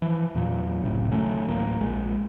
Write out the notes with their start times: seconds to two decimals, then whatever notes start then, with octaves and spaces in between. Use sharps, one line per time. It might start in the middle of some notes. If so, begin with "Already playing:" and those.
0.02 E3 F3
0.35 E2 A#2 F#3
0.82 F#1 C#2 A2 C3
1.12 D#3 F#3 A3 C#4
1.47 D1 A1 A#3
1.81 A#1 G#3